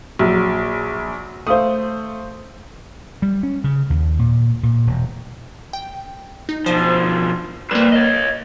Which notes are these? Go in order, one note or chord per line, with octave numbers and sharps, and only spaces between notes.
A#1 F#3
A3 C5 F5 D#6
G3
C#4
C#3
D#2
A#2
A#2
E1
G5
D#4
B2 F3 C5
G3 A#3 B4 C5 E7
C#5 D#5